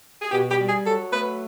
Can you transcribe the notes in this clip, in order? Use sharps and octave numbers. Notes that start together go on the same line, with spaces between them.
G#4
B2 G4
G4
G3
G#4
F#3 A4
A3 B4